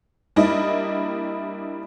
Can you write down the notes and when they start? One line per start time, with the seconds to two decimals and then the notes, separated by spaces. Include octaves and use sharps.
0.36 G3 A#3 D4 E4 D#5